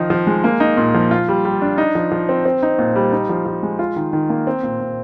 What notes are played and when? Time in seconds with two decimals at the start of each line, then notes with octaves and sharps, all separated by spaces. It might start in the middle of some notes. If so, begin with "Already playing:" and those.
Already playing: D#3 F3 D#4
0.10 F3
0.27 G#3
0.44 A#3
0.60 D#4
0.77 A#2
0.94 F3
1.11 F4
1.28 G3
1.45 G3
1.62 D4
1.78 D#4
1.95 F3
2.12 F3
2.29 C4
2.45 C4
2.63 D#4
2.79 A#2
2.95 G3
3.12 D#4
3.29 F3
3.46 F3
3.63 G#3
3.79 F4
3.96 D#3
4.13 D#3
4.30 A#3
4.47 C4
4.63 A#2
4.80 A#2